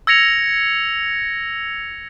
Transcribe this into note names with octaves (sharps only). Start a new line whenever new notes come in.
E6 G#6 A#6 C#7 F7